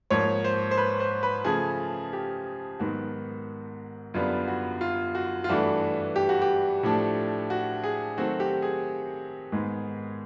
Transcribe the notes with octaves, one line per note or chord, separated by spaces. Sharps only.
G#2 F3 A#3 C#5
C5
C5
B4
C5
B4
C#3 F3 A3 G#4
G4
G#2 D#3 F#3 B3 F#4
F#2 D3 G3 B3 F4
F#4
F4
F#4
F4
G2 E3 A3 D4 F#4
G4
F#4
G4
A2 F3 A3 D4
F#4
G#4
D#3 F#3 A3 C4 F#4
G4
G#4
G#2 D#3 G#3 B3